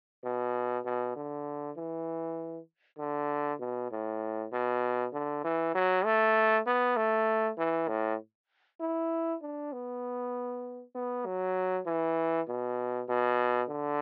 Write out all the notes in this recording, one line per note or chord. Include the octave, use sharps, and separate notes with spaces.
B2
B2
D3
E3
D3
B2
A2
B2
D3
E3
F#3
A3
B3
A3
E3
A2
E4
D4
B3
B3
F#3
E3
B2
B2
D3